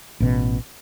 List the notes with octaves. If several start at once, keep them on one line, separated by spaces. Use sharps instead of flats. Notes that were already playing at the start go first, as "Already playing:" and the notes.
A1 B2